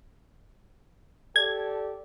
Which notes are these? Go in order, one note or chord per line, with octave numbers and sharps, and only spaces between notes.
G4 A4 D5 G#6